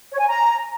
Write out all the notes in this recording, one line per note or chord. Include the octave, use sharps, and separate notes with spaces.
C#5
G#5
A#5